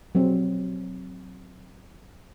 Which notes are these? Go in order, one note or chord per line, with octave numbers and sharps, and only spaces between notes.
F#3 C4